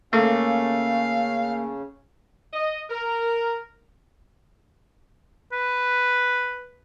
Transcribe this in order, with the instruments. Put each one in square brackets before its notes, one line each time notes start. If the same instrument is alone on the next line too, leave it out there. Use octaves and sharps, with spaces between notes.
[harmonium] C#3 C#4 [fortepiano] A3 [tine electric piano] A#3 [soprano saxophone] F5
[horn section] D#5
A#4
[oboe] B4